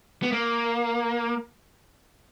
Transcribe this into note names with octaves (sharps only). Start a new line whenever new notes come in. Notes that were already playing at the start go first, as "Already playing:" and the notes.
B3
A#3